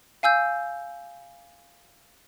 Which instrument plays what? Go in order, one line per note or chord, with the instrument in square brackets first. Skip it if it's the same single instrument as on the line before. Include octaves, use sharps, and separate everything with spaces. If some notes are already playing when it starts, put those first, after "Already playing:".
[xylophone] F5 G#5 E6 G6